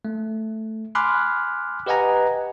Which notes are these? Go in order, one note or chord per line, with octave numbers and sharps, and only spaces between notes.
A3
G#5 B5 C6 D6 F6 F#6
G4 B4 D#5 F#5 G#5 A#5